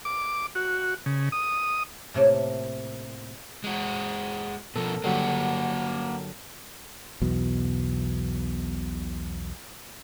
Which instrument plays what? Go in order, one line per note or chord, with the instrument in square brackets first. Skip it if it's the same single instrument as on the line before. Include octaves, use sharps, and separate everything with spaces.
[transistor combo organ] D6
F#4
C#3
D#6
[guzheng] A2 C3 A3 A#3
[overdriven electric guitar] G#3 F#4
[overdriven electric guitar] B2 F3 [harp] A4 A#4
[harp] G2 D3 F#3 [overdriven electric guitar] A#3 F#4
[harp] D3
[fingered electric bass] B1 E2 B2